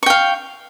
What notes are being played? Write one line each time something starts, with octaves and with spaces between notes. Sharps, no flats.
F5 G5 C#6